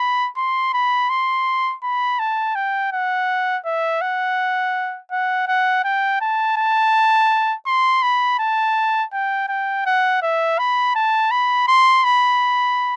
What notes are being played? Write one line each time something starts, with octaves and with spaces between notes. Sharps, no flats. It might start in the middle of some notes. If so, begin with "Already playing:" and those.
Already playing: B5
C6
B5
C6
B5
A5
G5
F#5
E5
F#5
F#5
F#5
G5
A5
A5
C6
B5
A5
G5
G5
F#5
E5
B5
A5
B5
C6
B5